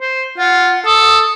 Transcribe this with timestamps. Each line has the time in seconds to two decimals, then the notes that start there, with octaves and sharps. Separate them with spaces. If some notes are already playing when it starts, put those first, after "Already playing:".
0.01 C5
0.38 F4 F#5
0.85 A4 D#6